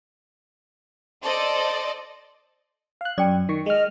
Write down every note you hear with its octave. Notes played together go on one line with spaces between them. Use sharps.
A4 C5 D5 D#5
F5 F#6
F#2 D5 G5 A5
D#3 C#6
G#3 D#5 F6